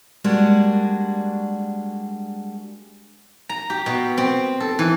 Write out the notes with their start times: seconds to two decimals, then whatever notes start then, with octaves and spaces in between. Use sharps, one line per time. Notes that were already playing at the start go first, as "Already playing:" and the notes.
0.24 G3 G#3 A#3 D4 F#4
3.49 A#5
3.70 G4
3.86 B2
4.18 C4
4.60 A4
4.79 E3